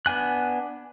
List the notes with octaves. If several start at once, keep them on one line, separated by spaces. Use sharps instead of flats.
B3 D4 G#5 F#6